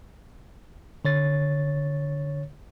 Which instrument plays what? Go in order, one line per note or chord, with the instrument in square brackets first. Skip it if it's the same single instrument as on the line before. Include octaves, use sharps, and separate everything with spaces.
[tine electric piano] D3 C#5 A6